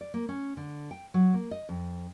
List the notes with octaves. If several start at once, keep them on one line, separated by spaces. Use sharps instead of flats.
D5
A#3
C#4
D3
G5
F#3
A#3
D#5
F2